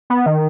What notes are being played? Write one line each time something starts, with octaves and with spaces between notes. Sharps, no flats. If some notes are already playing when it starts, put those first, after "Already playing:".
B3
D#3